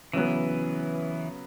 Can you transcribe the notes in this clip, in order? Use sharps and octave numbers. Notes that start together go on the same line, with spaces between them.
C#3 E3 F#3 B3